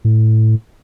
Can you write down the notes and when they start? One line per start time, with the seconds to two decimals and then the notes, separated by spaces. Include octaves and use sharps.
0.05 A2